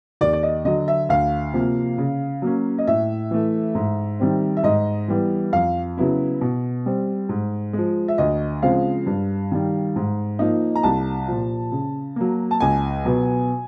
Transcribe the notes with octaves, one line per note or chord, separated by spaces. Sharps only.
D#2 D5
D5
D#5
D3 F#3 D#5
E5
D2 F5
C3 F3 A#3
C#3
F#3 A#3 C#4
D#5
A2 E5
E3 A3
G#2
D#3 G3 C4
E5
G#2 D#5
E3 G3 B3
F2 F5
C#3 F#3 B3 E4
B2
G3 C4
G#2
F3 G#3
E5
D2 D#5
C#3 F3 G#3 C4 F5
G2
D#3 G3
G#2
F3 A#3 D#4
A#5
C2 A5
A#2 F3
C#3
F#3 A#3
A5
C#2 G#5
B2 F#3 B3